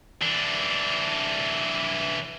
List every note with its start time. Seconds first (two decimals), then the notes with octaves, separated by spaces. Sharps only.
0.22 E3 D4